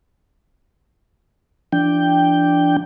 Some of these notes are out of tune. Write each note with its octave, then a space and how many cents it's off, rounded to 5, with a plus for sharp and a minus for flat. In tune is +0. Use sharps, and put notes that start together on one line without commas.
F3 -45 D4 +0 G5 +0